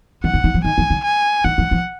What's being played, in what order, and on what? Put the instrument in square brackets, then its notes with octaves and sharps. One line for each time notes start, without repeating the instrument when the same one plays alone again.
[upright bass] D#3 [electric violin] F#5
[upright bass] D3
D#3
F3
[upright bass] D#3 [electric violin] G#5
[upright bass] F3
D3
[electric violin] G#5
[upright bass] D#3 [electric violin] F#5
[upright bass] F3
F3